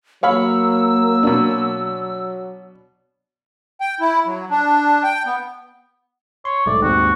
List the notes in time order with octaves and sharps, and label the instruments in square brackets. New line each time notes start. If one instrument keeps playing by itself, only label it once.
[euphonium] F#3 [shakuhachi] A#3 [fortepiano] C#5 F5 B5 [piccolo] E6
[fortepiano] B2 D4
[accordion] G5
E4
F#3
D4
G5
B3
[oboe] C#5 [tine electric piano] C6
[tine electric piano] B1 G#2 A3 [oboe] D5
[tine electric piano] D#2 G#2 C4 [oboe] F#4